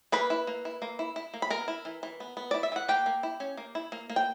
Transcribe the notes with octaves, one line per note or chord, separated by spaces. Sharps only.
A#3 B4 B5
E4
A#3
E4
A#3
E4
E4
A#3
B5
B3 A#4 A#5
E4
E3
E3
B3
B3
E4 D5
E5
E3 F#5
A#3 G4 G5
A#3
E4
C#4
A#3
E4
A#3
A#3
G5